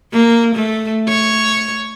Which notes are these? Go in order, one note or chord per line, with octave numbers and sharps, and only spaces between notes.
A#3
A3
C#5